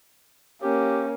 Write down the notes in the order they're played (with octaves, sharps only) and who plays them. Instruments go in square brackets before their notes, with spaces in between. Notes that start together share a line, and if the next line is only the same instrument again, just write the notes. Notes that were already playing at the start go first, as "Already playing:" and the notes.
[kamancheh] A#3 C#4 [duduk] G4